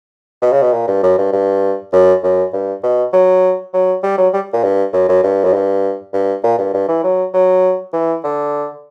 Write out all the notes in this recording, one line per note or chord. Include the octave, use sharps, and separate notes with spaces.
B2
C#3
B2
A#2
G2
F#2
G2
G2
F#2
F#2
G2
B2
F#3
F#3
G3
F#3
G3
A#2
G2
F#2
F#2
G2
F#2
G2
G2
A#2
G2
G2
E3
F#3
F#3
E3
D3